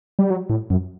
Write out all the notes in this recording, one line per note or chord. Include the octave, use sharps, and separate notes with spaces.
G3
F#3
A2
F#2